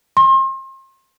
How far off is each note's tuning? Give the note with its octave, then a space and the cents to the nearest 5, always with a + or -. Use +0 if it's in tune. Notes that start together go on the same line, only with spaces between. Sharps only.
C6 +35